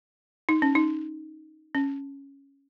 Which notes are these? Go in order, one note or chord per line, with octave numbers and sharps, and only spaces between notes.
D#4
C#4
D#4
C#4